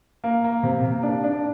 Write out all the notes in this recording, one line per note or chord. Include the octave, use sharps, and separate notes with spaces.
A#3
A#3
C3
A#3
D4
D4